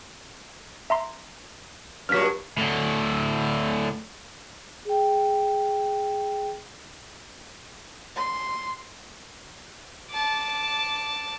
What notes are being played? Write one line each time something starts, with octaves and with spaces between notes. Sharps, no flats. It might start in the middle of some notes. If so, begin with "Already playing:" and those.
E5 A#5 C6
G2 A#2 F#3 F6 B6
A2 D3
G#4 G5
C6
A5 D6